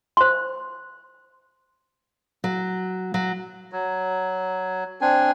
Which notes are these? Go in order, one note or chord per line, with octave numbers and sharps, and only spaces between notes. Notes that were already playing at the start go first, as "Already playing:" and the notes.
C5 C6
F#3
F#3
F#3
C4 D4 G#5